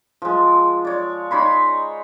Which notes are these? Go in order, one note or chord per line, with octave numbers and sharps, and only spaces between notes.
F3 G#3
C#5 D5
D#4 C#5 B5 C6